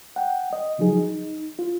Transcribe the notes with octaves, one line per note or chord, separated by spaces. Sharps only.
F#5 G5
D#5
C#3 F3 F#3 D#4 G#4
D#4
F4